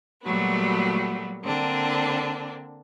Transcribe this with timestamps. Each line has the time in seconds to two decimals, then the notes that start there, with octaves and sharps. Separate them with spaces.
0.23 A#2 F#3 G3 A3 B3 F#4
1.43 D3 A#3 C4 D4